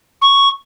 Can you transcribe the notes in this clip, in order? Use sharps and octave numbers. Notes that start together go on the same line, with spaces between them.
C#6